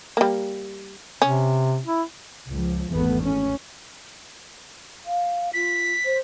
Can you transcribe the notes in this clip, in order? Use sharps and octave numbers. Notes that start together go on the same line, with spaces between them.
G3 A#3
C3 C#4
E4
C#2 F3
G#1 E2 A3 B3
C#4
F5
F4 B6
C5